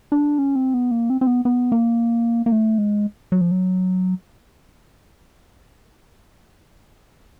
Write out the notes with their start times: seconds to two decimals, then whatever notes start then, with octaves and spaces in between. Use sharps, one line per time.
0.12 D4
0.38 C#4
0.56 C4
0.74 B3
0.91 A#3
1.10 C4
1.21 C4
1.27 B3
1.45 B3
1.72 A#3
2.46 A#3
2.52 A3
2.78 G#3
3.32 F#3
3.41 F3
3.51 F#3